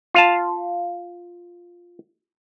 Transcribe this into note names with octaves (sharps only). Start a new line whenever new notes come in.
F4 F5 A5